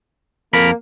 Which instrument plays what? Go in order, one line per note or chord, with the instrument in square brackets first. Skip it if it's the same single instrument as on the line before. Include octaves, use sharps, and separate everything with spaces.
[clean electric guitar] F2 A#4 B5 [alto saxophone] A#3